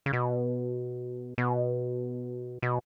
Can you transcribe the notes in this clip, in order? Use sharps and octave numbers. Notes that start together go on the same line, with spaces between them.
C#3
B2
B2
B2